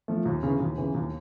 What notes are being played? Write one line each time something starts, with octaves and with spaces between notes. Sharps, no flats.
F3 A3
D#2
C#3 E3
D#2
C#3 E3
D#2